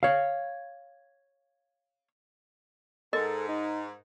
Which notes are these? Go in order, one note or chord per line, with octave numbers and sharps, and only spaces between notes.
C#5 F5
G#2 A4 A#4 D#5
D#4